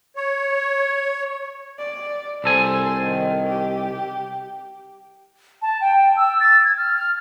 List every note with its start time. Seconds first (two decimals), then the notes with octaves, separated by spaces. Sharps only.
0.16 C#5
1.79 D5
2.44 C2 A4 C5 G#5
3.04 D#3
3.49 G4
5.62 A5
5.81 G5
6.17 E6
6.40 A6
6.65 G#6
6.77 F6
6.95 F6